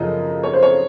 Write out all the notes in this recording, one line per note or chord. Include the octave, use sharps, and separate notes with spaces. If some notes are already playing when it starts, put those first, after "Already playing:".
Already playing: F#2 C#3 F3 D#5
C#5
C5
C#5